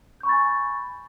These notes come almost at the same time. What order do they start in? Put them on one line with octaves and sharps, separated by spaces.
G6 C#6 B5 A6 G#5